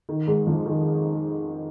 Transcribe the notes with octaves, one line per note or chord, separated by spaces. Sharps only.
D#3
G#2 G#3
F2 F3
D#3